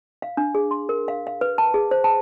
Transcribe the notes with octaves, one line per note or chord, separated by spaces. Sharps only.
F5
D4
G#4
C6
A#4
F5
F5
B4
A5
G#4
C5
A5